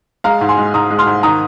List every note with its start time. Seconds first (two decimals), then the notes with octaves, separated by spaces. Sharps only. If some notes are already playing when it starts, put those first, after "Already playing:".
0.24 G#3 F5 A#5
0.41 G#2
0.49 G#5 C6
0.58 G#3
0.74 G#2 A#5 D#6
0.90 G#3
0.99 C6 F6
1.07 G#2
1.23 D#3 A#5 D#6